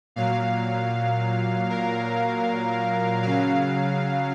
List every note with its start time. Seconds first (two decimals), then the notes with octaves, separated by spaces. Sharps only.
0.16 A#2 F#3 F5
1.69 A#4
3.22 C#3 F#3 F5